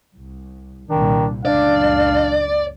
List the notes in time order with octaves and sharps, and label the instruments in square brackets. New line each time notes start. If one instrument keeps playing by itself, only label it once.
[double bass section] C2
[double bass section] C2 A#2 G3 [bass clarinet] D#3 [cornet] D4
[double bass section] C#2 F#2 A#2 [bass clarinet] D4 [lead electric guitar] D5 [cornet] F5